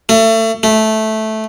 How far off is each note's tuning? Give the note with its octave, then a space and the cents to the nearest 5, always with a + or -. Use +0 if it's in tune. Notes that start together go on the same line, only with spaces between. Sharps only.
A3 +30
A3 -10